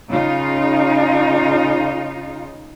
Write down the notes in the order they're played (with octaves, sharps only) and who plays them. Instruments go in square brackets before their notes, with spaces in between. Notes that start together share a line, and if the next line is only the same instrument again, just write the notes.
[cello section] C#3 D#4 F4